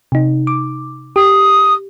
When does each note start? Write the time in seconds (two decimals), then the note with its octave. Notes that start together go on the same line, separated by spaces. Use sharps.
0.12 C3 D#4
0.47 D6
1.16 G4 D#6